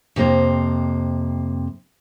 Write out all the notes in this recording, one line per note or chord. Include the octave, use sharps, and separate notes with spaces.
F2 C3 A#3 C5